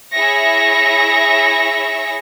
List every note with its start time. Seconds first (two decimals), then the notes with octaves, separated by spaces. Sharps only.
0.13 E4 G#4 C#5 E5 A#6 C#7